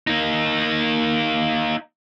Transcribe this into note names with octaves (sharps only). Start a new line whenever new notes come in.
A#3 D#4